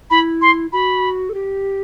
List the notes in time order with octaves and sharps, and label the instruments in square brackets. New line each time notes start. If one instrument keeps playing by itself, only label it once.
[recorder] E4 [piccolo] B5
[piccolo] C6
[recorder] F#4 [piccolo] B5
[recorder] A4
G4